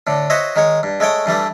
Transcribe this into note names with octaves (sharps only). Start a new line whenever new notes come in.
A2 D3
F#4 C5 C#5 D#5 E5
D#3 G#3 C#5
G2
G#3 A3 C#5 G5
G2 E3 G3 A3